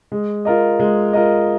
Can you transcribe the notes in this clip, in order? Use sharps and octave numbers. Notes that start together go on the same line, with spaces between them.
G#3
F4 A#4 D#5
G#3
F4 A#4 D#5